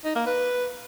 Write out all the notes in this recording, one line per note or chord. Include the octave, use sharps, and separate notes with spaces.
D#4
A#3
B4